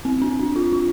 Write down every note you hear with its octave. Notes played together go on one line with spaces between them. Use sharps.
C4
D4
D4
F4
F4